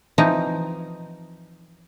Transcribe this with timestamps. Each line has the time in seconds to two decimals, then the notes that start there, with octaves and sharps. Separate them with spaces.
0.18 E3 F3 C4 D#4